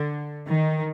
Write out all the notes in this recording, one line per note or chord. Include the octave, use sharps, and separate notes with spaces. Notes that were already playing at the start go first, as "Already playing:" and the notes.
Already playing: D3
D#3